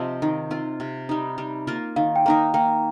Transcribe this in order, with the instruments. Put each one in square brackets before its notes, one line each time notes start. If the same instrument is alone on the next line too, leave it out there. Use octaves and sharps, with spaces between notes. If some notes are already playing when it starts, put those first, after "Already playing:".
Already playing: [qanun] C3 F3 C4 [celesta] D#5
[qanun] D#3
C4 F4
C3
G3 D#4
G3
A#3 F4 A#4
[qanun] D#3 [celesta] F5
[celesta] G5
[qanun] A#3 D#4 A#4
[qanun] A#3 [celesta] G5